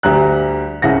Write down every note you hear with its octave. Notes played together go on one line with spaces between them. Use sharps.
D2 G3 A#5 F#6
C2 C#3 F#5 A#6